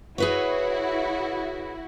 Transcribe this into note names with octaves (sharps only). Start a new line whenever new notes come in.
E4 F#4 G#4 B4 C#5